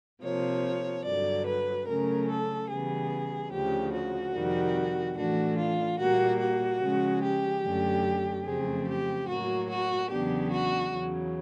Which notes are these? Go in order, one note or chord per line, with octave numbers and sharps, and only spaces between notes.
C3 F3 A#3 C#5
G2 D3 F#3 D5
B4
C#3 F#3 A3 C#4 A#4
A4
C#3 E3 G3 B3 G#4
D2 C#3 F3 G4
F#4
F2 C3 D#3 G3
A2 E3 A3 D4 F#4
F4
A#2 G3 A#3 F#4
F#4
C#3 F3 G#3 C#4
G4
F#2 D3 F#3 A3 C#4
F2 C#3 F#3 A3 C4 G#4
G4
A2 F#3 A#3 F#4
F#4
E2 C#3 F#3 B3 D4 G4
F#4
E2 C#3 F#3